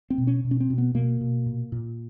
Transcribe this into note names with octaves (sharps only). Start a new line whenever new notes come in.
C4
B2
C#4
B2
C#4
C4
B2
B3
B2 A#3
B2
A#2
A#2